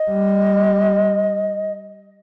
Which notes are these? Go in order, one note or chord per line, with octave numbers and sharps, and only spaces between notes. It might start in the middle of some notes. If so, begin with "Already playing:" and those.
Already playing: D#5
G3